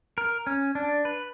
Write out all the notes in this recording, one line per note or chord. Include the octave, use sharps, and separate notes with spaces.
A#4
C#4
D4
B4